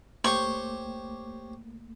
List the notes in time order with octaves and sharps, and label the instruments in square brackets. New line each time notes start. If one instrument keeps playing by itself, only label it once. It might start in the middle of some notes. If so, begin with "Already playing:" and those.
[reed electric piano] C#2 A3 A#3 [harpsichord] G4 C5 C#5 [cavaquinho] C#6